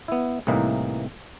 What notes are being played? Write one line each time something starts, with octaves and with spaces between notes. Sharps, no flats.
B3 E4
C2 A2 E3 A#3 D#4 B4